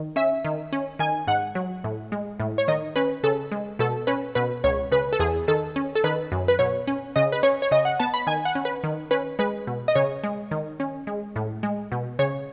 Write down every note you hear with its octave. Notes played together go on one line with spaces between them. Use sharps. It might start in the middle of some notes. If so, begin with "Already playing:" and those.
Already playing: D#3
C#4 E5
D#3
C#4
D#3 G#5
G#2 F#5
F#3
A2
G#3
A2
C#5
D#3 D#5
C#4 B4
C#3 A4
G#3
B2 A4
C#4 B4
B2 B4
C#2 C#5
C#3 B4
A4
E2 G#4
D#3 A4
C#4
A4
D#3 B4
F#2
B4
B2 C#5
C#4
C#3 D#5
B4
C#4 C#5
C#5
C#3 D#5
F#5
B3 A5
B5
D#3 G#5
F#5
C#4
B4
D#3
C#4 B4
G#3 B4
B2
D#5
C#3 C#5
G#3
D#3
C#4
G#3
A2
G#3
B2
C#3 C#5